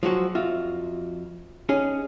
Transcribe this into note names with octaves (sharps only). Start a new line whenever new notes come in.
F3 F#3 G#3 F#4
F2 F4 F#4 E5
C#4 D#4 G#4